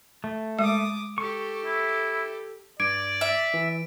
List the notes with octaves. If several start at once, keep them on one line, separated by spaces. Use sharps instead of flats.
A3
G#3 D6 D#6
G4 A4 C#6
E4
G2 D5 D6 G#6 D7
E5
E3